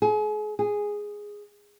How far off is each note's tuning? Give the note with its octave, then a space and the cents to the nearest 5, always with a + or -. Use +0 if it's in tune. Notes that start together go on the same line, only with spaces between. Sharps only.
G#4 +35
G#4 -5